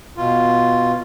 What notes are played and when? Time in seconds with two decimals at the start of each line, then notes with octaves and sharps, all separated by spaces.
0.17 B2 F4